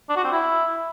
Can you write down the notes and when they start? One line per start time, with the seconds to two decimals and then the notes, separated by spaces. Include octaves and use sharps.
0.09 D4
0.16 F#4
0.24 C4
0.32 E4